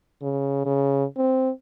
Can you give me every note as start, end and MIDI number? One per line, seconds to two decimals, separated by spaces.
0.23 0.63 49
0.66 1.05 49
1.17 1.51 60